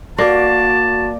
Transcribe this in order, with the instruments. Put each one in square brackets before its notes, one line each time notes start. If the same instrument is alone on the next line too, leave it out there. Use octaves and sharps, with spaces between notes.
[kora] A#3 [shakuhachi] F#4 [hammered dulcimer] D5 [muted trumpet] A5